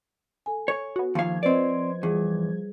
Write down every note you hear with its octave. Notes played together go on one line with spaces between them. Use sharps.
A4 G#5
C#5
B3 F#4
D#2 F3 F5 G#6
C4 B4 C5 D5 D#5
E2 G3 G#4